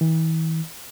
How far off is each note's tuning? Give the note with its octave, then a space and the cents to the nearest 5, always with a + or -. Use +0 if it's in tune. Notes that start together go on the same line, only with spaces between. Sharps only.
E3 -40